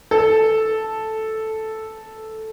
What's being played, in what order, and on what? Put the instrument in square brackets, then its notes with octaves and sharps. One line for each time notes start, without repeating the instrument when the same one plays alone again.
[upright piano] A4